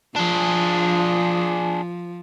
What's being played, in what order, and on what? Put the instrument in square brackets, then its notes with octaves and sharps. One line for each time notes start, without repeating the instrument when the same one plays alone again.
[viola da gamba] F3 [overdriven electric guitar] D4 G#4